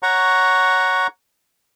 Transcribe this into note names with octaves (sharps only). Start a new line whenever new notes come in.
C#5 F#5 A#5 C#6